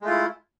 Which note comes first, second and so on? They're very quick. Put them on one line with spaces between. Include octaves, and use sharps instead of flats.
G#3 A3 F4 E4